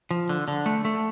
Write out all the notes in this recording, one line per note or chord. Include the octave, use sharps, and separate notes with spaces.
F3
D3
D3
A3
A3